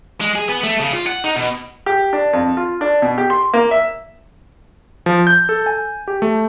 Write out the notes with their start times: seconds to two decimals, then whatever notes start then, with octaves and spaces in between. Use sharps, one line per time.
0.21 G#3
0.36 G#4
0.49 B3
0.63 A3
0.80 C#3
0.93 F4
1.07 F#5
1.24 D#4
1.36 B2
1.86 G4
2.13 D4
2.33 F2
2.57 F4
2.81 D4
3.02 B2
3.18 G4
3.30 C6
3.53 A#3
3.71 E5
5.06 F3
5.27 G6
5.49 A4
5.66 G#5
6.08 G4
6.22 A3